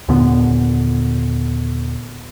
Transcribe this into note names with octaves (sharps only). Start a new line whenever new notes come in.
D#2 A#2 D3 B3